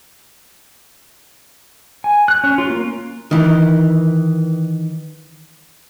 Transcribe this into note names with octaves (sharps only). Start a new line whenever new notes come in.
G#5
F#6
C#4
F4
A#3
D#3 E3